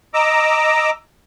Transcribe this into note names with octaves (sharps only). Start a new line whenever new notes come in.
D#5 A#5 D6 E6